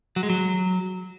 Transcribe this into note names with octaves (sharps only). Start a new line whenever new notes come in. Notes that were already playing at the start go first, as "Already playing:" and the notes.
F#3
G#3
F#3